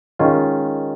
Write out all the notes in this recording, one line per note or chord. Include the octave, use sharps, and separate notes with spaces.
D#3 G#3 C#4 F4